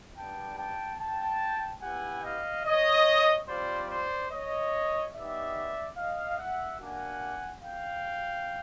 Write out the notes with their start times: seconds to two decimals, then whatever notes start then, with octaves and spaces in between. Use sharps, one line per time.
0.17 G3 B3 D4 G5 A5
0.58 G5 A5
0.99 G5 A5
1.82 B3 E4 G4 F#5 G#5
2.24 D#5 F5
2.65 C#5 D#5
3.48 G3 C4 F4 C5 D5
3.90 C5 D5
4.31 C#5 D#5
5.14 B3 D#4 G4 D5 E5
5.97 D#5 F5
6.39 E5 F#5
6.80 A#3 D4 F#4 F#5 G#5
7.63 F5 G5